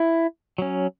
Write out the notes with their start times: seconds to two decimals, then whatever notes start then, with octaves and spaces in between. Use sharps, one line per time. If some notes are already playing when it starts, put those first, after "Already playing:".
Already playing: E4
0.58 F#3 C#4